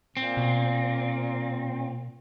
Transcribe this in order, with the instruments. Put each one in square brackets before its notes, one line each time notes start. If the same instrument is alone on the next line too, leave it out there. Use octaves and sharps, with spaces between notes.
[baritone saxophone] A#2 [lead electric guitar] C4
[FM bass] B2